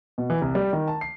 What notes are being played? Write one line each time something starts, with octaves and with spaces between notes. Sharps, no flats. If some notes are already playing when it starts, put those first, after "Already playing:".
B2
E3
C2
G3
D#3
A5
C7